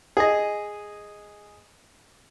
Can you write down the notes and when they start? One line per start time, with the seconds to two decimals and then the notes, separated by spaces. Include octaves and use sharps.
0.17 G#4 D#5